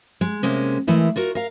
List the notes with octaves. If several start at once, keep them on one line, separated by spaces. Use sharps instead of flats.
G#3
C3 G#3 A#3 C#4
E3 G#3 A3 E4 A#4
F4 F#4 A#4
A#4 F5